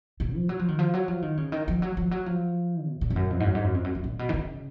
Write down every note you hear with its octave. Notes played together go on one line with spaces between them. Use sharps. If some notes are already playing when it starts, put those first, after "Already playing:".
A#2
F3
F#3
F3
D#3
F3
F#3
F3
D#3
C#3
D#3
F3
F#3
F3
F#3
F3
B2
A#2
F2
F#2
F2
G#2
F#2
G#2
F#2
F2
F#2
F#2
A#2
B2
D#3
C#3